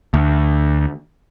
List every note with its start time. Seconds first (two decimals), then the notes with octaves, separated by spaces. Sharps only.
0.14 D2